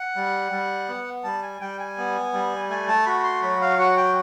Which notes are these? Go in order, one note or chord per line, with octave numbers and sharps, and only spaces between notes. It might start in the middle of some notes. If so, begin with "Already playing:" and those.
Already playing: F#5
G3
G3
B3
G3 A5
G#5
G3 G5
G#5
B3
G3
A3 G#5
A5
F#4 B5
C6
F#3 B5
F5
F#4 F#5
G5